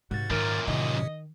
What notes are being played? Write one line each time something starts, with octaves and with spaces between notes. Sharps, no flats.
G#2 C3 G3 A#3 F#4 A6
F#2 A#2 D#3 A#4
A2 C3 D#3 D#5